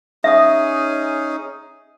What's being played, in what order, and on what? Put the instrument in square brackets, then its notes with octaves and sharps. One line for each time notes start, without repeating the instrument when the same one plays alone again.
[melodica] C#4 D#4 G#4 [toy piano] E5 D#6